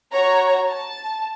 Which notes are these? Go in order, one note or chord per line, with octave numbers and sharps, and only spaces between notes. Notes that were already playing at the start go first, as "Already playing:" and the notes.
F#4 C#5 A#5
A5